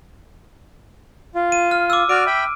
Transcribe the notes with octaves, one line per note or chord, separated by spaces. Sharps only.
F4
D#7
F6
D6 E6
F#4 D5 F6 D7
E5 G5 B5